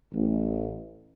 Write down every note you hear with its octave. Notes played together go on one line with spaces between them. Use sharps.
A1